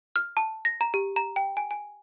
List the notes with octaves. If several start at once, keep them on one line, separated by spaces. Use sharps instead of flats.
F6
A5
A#6
A#5
G4
A#5
G5
G#5
G#5